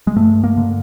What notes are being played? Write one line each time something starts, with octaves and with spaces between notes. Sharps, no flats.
G#3
G2 A3
A#3
D3